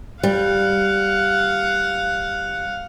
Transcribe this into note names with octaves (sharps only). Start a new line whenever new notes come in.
G3 F5 F#5